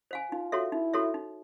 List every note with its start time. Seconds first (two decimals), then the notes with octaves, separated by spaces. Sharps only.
0.11 C5 F5 G#5
0.32 D#4 F4
0.52 F#4 A4 C#5 E5
0.72 D#4 E4
0.93 F#4 A4 C#5 E5
1.14 D#4